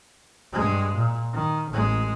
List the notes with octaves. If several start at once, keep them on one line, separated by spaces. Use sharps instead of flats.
G2 G#3
A#2
D#3
A1 G#3